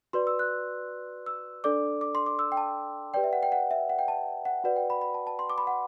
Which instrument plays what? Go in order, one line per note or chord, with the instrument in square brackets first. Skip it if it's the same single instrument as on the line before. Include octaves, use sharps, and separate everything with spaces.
[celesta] F#4 B4 D5 C6
E6
F#6
E6
D4 A4 D5 D6
D6
C6
D6
E6
G5
A5
G4 B4 D5 G5
E5
F#5
G5
F#5
E5
F#5
G5
A5
F#5
F#4 B4 D5 F#5
G5
B5
B5
A5
A5
C6
D6
B5
F#5